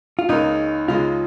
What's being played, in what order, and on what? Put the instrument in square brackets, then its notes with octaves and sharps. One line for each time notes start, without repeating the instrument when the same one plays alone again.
[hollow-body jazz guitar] F4
[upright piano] C#2 C#3 A#3 [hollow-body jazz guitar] D#4
[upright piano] C#2 C#3 G#3 D#4 [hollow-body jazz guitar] F4